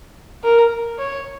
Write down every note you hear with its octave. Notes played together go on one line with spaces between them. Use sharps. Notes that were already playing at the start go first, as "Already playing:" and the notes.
A#4
C#5